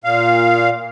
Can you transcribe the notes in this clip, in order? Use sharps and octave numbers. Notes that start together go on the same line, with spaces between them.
A#2 F5